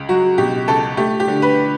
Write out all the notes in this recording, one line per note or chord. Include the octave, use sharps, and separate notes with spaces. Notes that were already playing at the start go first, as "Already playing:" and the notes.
Already playing: C#2
F#3 F#4
B2 G4
C#2 A4
A3 G4
G4
D3
B4